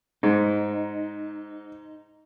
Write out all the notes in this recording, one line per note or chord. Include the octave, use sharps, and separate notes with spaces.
G#2 D#4